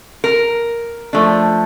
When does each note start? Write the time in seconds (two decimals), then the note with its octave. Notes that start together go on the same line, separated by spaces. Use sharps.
0.24 A#4
1.13 F3 A3 D4